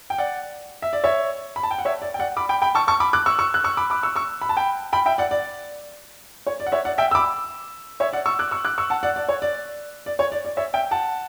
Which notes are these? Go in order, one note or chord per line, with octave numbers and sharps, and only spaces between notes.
G5
D5 F#5
E5
D5
C#5 E5
B5
A5
G5
F#5
C#5 E5
D5
G5
D5 F#5
B5 D6
G5 B5
G5 B5
A5 C#6
A5 C#6
B5 D6
D6 F#6
C#6 E6
C#6 E6
F#6
C#6 E6
B5 D6
B5 D6
C#6 E6
C#6 E6
B5
A5
G5 B5
G5 B5
E5 G5
D5 F#5
D5
C#5
D5
F#5
C#5 E5
D5 F#5
E5 G5
E6
B5 D6
C#5 E5
D5 F#5
C#6 E6
D6 F#6
C#6 E6
D6 F#6
C#6 E6
F#5 A5
D5 F#5
D5
C#5
D5
D5
C#5
D5
D5
C#5 E5
E5 G5
F#5 A5